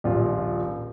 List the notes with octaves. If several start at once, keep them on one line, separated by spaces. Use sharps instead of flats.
D#1 A#1 F4